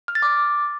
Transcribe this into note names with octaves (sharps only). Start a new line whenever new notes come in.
F6
A6
D6